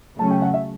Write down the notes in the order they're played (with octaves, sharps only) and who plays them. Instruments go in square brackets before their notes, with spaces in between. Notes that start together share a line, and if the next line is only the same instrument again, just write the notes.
[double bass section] C#3 F#3 A3 C#4 [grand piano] A5
[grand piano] G5
F#5
E5